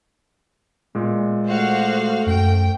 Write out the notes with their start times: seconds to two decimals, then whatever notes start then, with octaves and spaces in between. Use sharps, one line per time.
0.95 A#2 G#3 B3
1.46 A3 F#4 C5 F5
2.26 F#2 G5